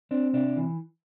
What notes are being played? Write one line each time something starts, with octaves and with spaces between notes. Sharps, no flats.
C4 D4
C3 D4
E3